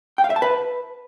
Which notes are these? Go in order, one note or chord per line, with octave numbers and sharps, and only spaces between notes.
G5
F5
E5
A5
B4